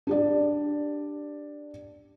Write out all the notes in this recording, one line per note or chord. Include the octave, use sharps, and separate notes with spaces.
D4 G4 D5